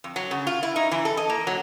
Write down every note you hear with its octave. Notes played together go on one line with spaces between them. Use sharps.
F2
F#3
C#3
F4
E4
D#4
E3
A4
D#5
A#3
F#3